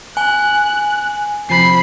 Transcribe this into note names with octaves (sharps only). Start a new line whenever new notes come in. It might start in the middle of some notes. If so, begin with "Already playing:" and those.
G#5 F#6
C3 F3 B5 C7